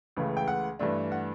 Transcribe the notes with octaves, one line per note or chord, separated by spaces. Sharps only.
C#2 C#3 E3 A3
G5
F#5
G2 E3 A3 D4
F#5